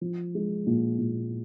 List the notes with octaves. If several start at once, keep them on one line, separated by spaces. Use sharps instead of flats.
F3
G#3
A#2
A#2